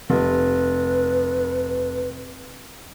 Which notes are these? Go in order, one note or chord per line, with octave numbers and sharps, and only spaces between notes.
F1 B4